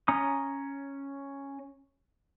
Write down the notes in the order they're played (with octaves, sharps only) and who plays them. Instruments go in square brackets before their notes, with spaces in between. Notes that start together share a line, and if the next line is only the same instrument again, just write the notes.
[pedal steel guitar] C#4 A#5 D#6